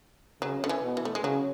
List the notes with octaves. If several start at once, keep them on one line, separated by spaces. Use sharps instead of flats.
C#3 F#3
D3
E3
B2
E3
A3
G#3
C#3 F#3